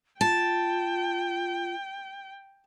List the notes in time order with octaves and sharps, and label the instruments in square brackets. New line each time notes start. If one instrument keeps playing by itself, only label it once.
[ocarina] F4 [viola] G5 [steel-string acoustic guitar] A5